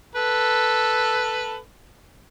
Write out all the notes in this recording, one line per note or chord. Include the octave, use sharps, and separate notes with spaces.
A4 B4